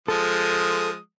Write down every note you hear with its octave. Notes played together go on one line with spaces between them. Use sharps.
F3 G#3 A4 D#6